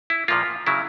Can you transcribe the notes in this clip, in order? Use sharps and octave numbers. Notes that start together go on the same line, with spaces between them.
E4
A#2 F3 A#3 F4
C#3 F#3 E4